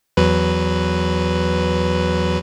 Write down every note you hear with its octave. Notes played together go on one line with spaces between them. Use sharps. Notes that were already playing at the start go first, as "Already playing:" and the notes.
E2 F#3 B4